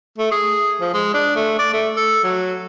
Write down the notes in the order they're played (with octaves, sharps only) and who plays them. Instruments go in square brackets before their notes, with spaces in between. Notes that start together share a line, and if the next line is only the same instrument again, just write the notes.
[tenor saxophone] A3
G#4
F3
G#3
D4
A3
D5
A3
A4
F#3